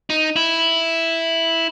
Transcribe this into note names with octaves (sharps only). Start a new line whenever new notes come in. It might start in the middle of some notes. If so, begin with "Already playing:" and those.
D#4
E4